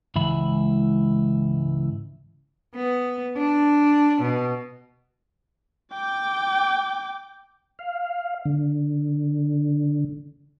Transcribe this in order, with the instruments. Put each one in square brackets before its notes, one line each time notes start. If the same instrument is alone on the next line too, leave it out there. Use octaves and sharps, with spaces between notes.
[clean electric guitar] C#2 G#2 E3 E4 B5
[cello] B3
D4
B2
[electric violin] G5 D6
[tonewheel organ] F5
D3